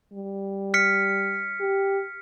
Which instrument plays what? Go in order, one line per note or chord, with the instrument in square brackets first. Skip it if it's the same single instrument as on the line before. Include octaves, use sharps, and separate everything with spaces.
[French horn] G3
[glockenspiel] F6 B6 C#7
[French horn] G4